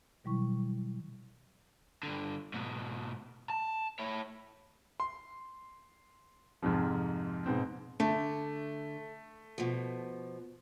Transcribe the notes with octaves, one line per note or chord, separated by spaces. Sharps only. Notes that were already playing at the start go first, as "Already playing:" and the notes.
B2 D#3 F#3 G3 E4 C#6
G2 D3
G#2 B2
A5
E4 C#5
C6
F2 G#2 C3 F3
G#2 B2 C4
D3 A3
B2 F3